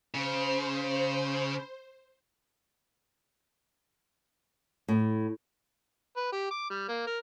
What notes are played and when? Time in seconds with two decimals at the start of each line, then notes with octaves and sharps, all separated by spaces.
0.14 C#3 C5
4.88 A2
6.17 B4
6.32 G4
6.51 D6
6.70 G3
6.89 A#3
7.07 A#4